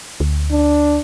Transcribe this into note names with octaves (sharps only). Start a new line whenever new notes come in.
D2
D4